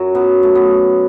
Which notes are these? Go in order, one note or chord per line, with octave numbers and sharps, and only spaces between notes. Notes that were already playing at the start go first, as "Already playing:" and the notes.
Already playing: F#2 F#3
B2 B3
A3
B3